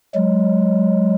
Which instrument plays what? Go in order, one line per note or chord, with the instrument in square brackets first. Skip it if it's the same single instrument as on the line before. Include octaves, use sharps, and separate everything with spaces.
[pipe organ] F#3 G#3